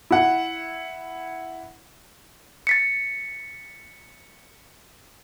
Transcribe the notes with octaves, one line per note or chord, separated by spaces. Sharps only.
E4 F#5
A6 B6 C#7